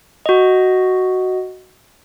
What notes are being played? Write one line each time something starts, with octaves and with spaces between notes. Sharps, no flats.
F#4 D#5